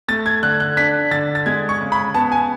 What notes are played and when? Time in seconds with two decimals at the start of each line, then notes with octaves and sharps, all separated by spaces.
0.08 A3 A6
0.26 G#6
0.43 D3 F#6
0.60 F#6
0.77 D4 B6
1.11 D3 A6
1.35 A6
1.46 G#3 G#6
1.69 C#6
1.81 C#3
1.92 B5
2.14 B3 A5
2.32 G#5